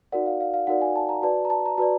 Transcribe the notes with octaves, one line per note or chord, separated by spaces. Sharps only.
D#4 F#4 A#4 D5 F#5
F5
F5
F5
D#4 F#4 A#4 D5 F#5
G#5
A5
A#5
F#4 B4 D5 A5
A#5
A5
A#5
F#4 B4 D5 A5